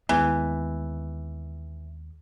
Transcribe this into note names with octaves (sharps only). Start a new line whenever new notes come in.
D#2 E3 G#3 B3